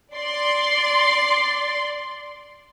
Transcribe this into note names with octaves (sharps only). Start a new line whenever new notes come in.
D5 C6